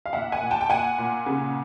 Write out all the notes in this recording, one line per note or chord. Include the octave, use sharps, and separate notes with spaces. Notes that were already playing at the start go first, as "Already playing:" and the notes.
F5
A#2 E5 F#5
F#5 G#5
A#2
G5 A5
G5
A#2 F#5 G#5
A#2
C#3